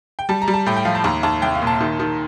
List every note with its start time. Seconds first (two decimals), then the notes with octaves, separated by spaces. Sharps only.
0.19 G5
0.29 G3 A5
0.42 A#5
0.48 G3
0.54 A5
0.66 A2 G5
0.77 G5
0.85 F3 F5
0.95 A5
1.04 D#2 A#5
1.23 D#2 A5
1.42 C2 G5
1.55 F5
1.61 A#2
1.67 A5
1.81 D#3
2.00 D#3